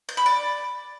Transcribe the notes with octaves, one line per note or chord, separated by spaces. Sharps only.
G6
B5
D5